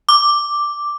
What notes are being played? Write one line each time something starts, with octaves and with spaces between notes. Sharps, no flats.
D6